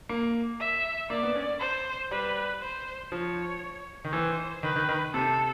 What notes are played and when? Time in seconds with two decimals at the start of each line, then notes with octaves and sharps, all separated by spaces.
0.09 A#3
0.60 E5
1.10 A#3 D5
1.23 B3
1.35 C#4
1.60 C5
2.11 G3 B4
2.61 C5
3.12 F3 C#5
4.04 D#3
4.13 E3 C5
4.63 D#3 B4
4.76 D#3
4.89 D#3
5.14 C3 A4